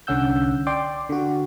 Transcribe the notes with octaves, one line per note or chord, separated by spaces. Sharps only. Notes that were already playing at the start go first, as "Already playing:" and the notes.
C2 D3 C#4 F#5 E6 G6
D5 G5 C6 D6
D3 F#4